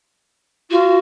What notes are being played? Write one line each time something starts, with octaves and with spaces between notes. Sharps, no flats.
F4 F#4